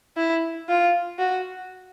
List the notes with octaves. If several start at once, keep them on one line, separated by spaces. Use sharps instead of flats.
E4
F4
F#4